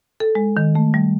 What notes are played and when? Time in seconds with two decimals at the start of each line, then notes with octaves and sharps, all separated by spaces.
0.20 A4
0.35 G#3
0.57 D#3
0.75 A3
0.94 G3